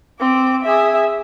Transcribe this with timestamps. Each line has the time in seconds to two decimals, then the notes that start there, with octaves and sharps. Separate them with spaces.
0.20 C4 D6
0.63 G#4 E5